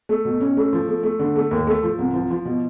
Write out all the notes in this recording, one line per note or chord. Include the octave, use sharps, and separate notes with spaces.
A3
B2
C#4
A3
F3
A3
A3
D3
A3
D#2
A3
F3
C2
F3
F3
B2